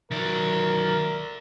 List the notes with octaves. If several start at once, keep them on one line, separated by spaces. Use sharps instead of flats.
D#3 F#3 A#4 D5 E5